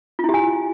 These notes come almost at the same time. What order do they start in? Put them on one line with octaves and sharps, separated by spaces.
F4 E4 G4 G#5